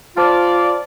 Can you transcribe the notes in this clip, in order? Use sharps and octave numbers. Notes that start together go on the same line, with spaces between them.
F4 C5 D5 A5 F6